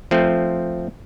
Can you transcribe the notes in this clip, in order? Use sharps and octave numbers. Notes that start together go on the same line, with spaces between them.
F3 A3 C4